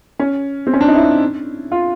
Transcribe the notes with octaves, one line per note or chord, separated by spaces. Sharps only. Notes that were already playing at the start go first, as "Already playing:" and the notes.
C#4
C4
C#4
D4
D#4
E4
F4